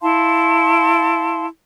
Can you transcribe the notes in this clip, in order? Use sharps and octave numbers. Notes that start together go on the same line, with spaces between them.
E4 F5 A5 C6